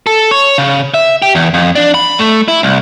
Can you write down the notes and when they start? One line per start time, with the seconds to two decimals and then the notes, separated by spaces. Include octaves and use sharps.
0.07 A4
0.31 C#5
0.58 C#3
0.94 E5
1.22 G4
1.35 E2
1.54 F2
1.75 D4
1.94 B5
2.19 A3
2.48 E4
2.63 C2